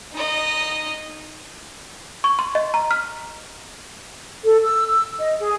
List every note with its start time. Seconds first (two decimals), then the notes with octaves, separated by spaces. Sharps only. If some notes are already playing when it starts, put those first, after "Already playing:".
0.14 D#4 D#5
2.24 C#6
2.39 C6
2.55 D#5
2.74 A#5
2.91 F6
4.44 A4
4.62 E6
4.88 E6
5.19 D#5
5.40 G#4